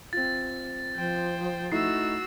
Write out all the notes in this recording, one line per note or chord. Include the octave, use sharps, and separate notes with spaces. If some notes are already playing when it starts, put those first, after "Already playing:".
C4 F4 A6
F3 C5 G5
A3 D#4 E4 F#4 E6 C7